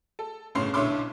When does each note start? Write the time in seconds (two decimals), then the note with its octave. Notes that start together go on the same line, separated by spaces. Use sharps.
0.19 A4
0.55 G1 A2 C#3 C6 C7
0.74 B1 D3 E4 C#5 C6 D6